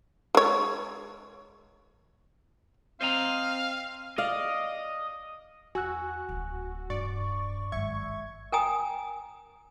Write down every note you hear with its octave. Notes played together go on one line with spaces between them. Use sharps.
G#3 C#5
C4 C5 D#5 F5 A#5
D5 D#5 F5
E2 F#4 G#5 E6 F#6
D1 C#3
G2 D5 C#6
G#1 F#3 G#3 E5 C#6 G#6
A#4 G5 G#5 A#5 D#6